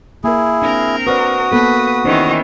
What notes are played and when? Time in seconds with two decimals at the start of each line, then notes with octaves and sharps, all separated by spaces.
0.24 A#3 E4 G#4 A#4
0.62 C4 D4 A#4
1.07 F#4 B4 C5 D5 D#6
1.52 A#3 B3 A4 B4
2.05 D#3 E3 C#4 D#4 C5